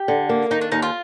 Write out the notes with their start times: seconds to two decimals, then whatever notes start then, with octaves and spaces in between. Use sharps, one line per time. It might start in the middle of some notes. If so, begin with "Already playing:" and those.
Already playing: G4
0.08 D3
0.29 A#3
0.51 D#3 D#4
0.61 D4
0.72 D#2 D#4
0.82 F4